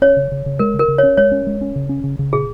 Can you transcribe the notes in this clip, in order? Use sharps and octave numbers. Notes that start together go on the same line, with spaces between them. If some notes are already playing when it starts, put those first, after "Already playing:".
C#4 C#5
C#3
C#3
C#3
G#3 A#4
C#3
A#4
C#3
C#4 C#5
G#3 C#5
C#4
G#3
C#4
C#3
C#4
C#3
C#3
A#2 G#4